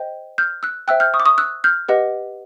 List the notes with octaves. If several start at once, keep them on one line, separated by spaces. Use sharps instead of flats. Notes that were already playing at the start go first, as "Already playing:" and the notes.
Already playing: C5 D#5 G5
F6 G6
E6 F#6
C5 E5 G5 E6 F#6
F6 G6
C#6 D#6
D6
C#6 D#6
E6 F#6
F6 G6
G4 B4 D#5 F#5